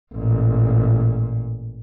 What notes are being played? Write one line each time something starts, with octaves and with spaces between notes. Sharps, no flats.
A1 A#2